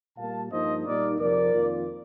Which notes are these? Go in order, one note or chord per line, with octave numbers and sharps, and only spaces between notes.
A#2 G3 A#3 F5 A5
G2 F3 A#3 D#4 C5 D#5
A#2 G3 A#3 D#4 A#4 D5
F2 C3 F3 A#4 D5
F2 D#3 A#3 F4